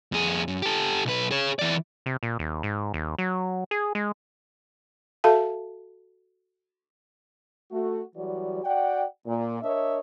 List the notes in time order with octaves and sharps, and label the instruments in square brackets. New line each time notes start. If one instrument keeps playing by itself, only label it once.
[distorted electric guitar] F2 G#4
F#2
G4 A4
B1 B4
G#4 C#5
E3 D5
[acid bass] C3
A#2
D#2
G#2
D#2
F#3
G#4
G#3
[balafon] F#4 A4 E5 F5 A5
[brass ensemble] A3 F#4
E3 F#3 G3 F#4 D5
F#4 D5 F#5 G5
A#2
D4 A#4 C#5 D#5 E5